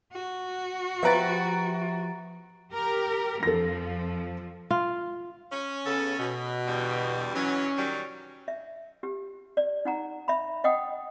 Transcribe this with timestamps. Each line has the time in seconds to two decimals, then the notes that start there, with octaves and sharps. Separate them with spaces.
0.13 F#4
1.03 F3 B3 G4 B4 E5 A#5 A6 D7
2.72 G4 A#4
3.43 F2 F3 A4 A#6
4.71 F4
5.52 C#4
5.86 C#3 B3 A4
6.19 B2
6.67 E2 D3 G3
7.35 E3 F#3 C#4
7.77 D#3 F#3 G3
8.48 E5
9.03 G4
9.57 D5
9.85 D#4 F#5 A#5
10.28 E5 B5
10.64 D#5 F#5 G5 D#6